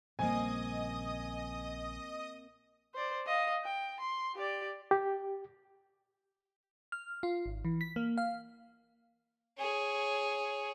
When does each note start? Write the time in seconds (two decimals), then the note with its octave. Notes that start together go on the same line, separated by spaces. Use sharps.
0.19 A#1 C#3 G3 A#3 C4 D#5 G#5 D#6
2.95 C5 D5
3.26 D#5 F5
3.64 G5
4.00 C6
4.35 G4 D5
4.91 G4
6.92 F6
7.23 F4
7.46 G#1
7.65 E3
7.81 B6
7.96 A#3
8.18 F5
9.58 G#4 C#5